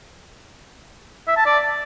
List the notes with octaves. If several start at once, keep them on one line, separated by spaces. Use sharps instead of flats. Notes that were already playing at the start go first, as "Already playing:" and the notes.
E5
A5
D5